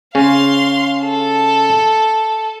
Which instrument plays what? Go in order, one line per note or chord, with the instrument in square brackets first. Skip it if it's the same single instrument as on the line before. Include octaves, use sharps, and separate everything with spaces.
[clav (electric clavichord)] C#3 C#4 [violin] F5 C6
[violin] A4